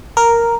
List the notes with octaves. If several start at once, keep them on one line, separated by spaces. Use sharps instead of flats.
A#4